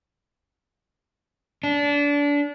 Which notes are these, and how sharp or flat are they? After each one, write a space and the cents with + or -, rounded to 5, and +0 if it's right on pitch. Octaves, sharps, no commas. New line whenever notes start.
D4 -25